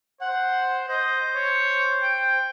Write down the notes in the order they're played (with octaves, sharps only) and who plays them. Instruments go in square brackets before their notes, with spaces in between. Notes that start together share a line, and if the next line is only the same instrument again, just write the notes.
[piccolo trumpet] C5 [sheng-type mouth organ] F#5
[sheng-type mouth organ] C5 [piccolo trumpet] D#5
[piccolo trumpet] C#5
G5